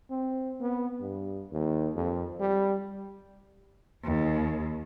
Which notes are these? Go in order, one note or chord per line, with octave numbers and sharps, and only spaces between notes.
C4
B3
G2
D#2
F2
G3
D#2